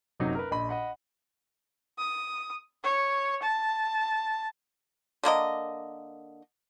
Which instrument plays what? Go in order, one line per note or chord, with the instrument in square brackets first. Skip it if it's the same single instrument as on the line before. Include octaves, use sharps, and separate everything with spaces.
[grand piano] F#1 C3 F#3 D#4
A#4 B4
A#1 D#5 B5
D#5 F#5 B5
[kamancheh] D#6
C#5
A5
[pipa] D3 A#3 A#4 D#5